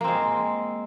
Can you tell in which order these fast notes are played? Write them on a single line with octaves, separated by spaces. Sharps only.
A#3 C4 G#3